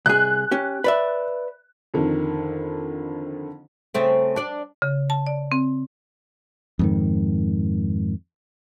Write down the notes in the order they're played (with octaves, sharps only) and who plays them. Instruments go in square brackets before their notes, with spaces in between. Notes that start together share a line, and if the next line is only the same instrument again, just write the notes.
[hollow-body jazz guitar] C2 G#4 [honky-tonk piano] F#6
[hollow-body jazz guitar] C#4 G4
B4 D5 E5
[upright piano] F2 D3 D#3
[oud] C#3 A3 C4
D4 D5
[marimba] C#3
A5
D5
C4
[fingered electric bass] F2 G#2 D#3